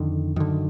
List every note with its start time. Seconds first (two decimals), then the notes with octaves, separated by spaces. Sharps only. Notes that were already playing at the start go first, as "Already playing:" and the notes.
Already playing: F2 D3 D#3
0.36 F#2 D3 D#3